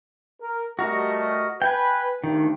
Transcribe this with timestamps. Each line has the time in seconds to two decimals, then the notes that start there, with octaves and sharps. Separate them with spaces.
0.40 A#4
0.79 G3 A3 F#4 A#4 D#5
1.62 B4 G5 G#5
2.24 D2 G2 D#3